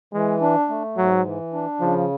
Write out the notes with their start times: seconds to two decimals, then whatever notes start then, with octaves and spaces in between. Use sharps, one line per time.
0.13 E3 G#3
0.41 D4
0.69 A3
0.97 G#2 F#3
1.25 E3
1.53 D4
1.80 C#3 F3